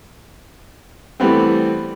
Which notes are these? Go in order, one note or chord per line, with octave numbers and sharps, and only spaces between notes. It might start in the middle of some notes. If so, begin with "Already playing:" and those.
E3 G3 A3 B3 C4